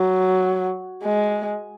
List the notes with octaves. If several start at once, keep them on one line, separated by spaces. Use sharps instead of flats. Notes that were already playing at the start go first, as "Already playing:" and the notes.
Already playing: F#3
G#3